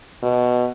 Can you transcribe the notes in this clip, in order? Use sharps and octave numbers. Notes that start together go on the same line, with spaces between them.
B2